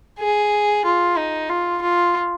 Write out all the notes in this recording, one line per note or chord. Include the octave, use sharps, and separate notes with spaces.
G#4
F4
D#4
F4
F4